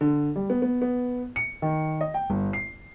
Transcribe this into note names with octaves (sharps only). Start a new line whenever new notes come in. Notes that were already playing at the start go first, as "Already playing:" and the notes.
D3
G3
B3
B3
B3
C#7
D#3
D#5
G5
G1
C7